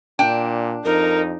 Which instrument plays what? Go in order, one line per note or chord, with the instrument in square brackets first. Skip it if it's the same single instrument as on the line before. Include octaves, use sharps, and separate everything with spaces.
[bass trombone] A#2 [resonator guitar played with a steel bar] D4 G5
[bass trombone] F2 [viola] D#4 [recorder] A#4